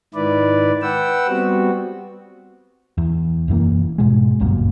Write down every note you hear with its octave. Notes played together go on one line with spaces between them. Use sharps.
G#2 D#3 E4 B4 D5
B4 F#5 G5 E6
G3 B3 C4 F#4
E2
E1 F#2 E3 A#3
G#2 B2 G#3
G1 C#2 F#2 A#2